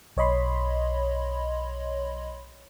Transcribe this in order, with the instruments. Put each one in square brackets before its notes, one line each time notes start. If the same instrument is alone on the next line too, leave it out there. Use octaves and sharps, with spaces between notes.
[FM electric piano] B1 C#5 D#5 B5 C6